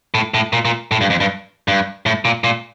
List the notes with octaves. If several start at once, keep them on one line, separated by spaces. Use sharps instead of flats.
A2
A2
A#2
A#2
A2
G2
F2
G2
G2
A2
A#2
A#2